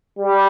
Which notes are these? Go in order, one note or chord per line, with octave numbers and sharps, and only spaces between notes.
G3